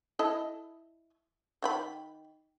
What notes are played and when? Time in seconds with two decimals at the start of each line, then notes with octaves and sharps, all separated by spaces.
0.19 E4 A4 D#5
1.62 D#3 G5 B5